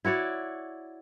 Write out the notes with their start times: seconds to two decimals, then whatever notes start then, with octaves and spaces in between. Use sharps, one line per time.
0.05 E4 F#4 C#5 D5